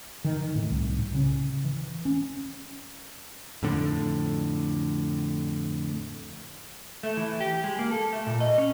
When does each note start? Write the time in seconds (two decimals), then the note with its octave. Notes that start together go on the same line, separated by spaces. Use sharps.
0.25 D#3
0.40 D#3
0.55 A2
0.71 C2
0.99 A2
1.14 C#3
1.65 E3
2.05 C#4
3.63 F2 A2 D3
7.03 A3
7.17 E3
7.40 G4
7.64 G#3
7.79 A#3
7.91 A4
8.13 A3
8.27 A#2
8.40 D#5
8.58 C#4